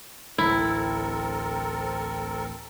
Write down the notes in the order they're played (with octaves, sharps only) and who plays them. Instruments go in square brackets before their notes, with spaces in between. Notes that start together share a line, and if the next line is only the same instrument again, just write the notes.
[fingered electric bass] A1 D2 [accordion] C4 A4 A#4 [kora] E4